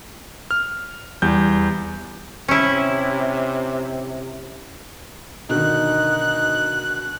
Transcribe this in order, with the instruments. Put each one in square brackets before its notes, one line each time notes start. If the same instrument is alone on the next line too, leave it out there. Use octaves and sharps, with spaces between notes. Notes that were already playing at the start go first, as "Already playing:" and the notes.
[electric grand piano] F6
E2 G3 G6
[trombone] C3 [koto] C#4 E4
[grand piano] B2 D3 D#3 [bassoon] D#4 [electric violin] F#6